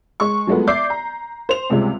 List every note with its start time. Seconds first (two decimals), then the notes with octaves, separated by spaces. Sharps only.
0.20 G#3 C#6
0.47 F3 F#3 G#3 A3 B3
0.67 D5 E5 D6 G6 C7
0.90 A#5
1.49 C5 F7
1.70 C#2 C3 G3 G#3